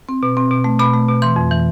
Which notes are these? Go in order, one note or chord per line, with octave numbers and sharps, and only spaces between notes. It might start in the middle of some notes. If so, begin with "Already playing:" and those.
C4
B2
C4
B2
A3
B2 B5
A3
B2
E3 C6
F2
E3